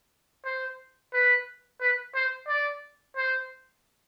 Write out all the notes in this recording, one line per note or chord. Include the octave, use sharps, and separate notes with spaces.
C5
B4
B4
C5
D5
C5